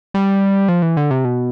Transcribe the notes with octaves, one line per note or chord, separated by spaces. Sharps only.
G3
F3
E3
D3
C3
B2